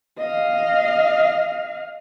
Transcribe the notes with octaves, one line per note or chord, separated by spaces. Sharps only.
D#5 F5